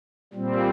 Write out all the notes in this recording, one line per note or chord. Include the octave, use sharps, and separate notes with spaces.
A#2 G3 C4